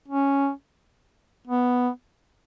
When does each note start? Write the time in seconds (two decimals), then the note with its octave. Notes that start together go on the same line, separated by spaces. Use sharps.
0.08 C#4
1.47 B3